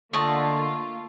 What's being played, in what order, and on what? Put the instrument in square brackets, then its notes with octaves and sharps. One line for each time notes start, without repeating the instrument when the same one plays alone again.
[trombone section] D3 [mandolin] A3 [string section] A#3 F4 [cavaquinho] D#5 A5